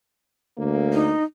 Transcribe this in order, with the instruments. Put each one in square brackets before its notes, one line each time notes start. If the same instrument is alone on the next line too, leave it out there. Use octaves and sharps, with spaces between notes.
[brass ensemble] D2 A#3
[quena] D#4